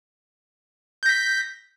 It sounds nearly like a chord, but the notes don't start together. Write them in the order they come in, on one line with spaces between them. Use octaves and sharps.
G6 A#6 B6